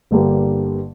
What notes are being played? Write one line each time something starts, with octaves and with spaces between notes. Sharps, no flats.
G1 G2 D3 G3 A#3